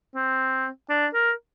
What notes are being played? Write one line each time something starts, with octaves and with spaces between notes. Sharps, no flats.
C4
D4
A#4